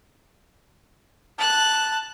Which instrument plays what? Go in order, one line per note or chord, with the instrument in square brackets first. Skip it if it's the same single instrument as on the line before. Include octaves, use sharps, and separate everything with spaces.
[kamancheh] A5 F#6